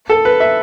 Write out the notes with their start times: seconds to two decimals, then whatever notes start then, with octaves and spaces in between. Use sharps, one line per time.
0.10 A4
0.25 B4
0.40 E5